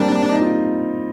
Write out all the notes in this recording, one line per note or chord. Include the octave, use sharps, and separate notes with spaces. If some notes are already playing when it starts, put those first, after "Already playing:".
Already playing: G3 A#3 C4 D4
G3
D#4
F4